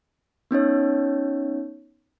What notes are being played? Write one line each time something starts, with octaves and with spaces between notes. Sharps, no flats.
B3 C#4 D#4 C#5